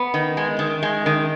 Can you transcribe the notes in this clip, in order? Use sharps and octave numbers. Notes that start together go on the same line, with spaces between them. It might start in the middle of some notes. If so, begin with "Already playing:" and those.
Already playing: B3
D#3
G#3
D#3
G#3
D#3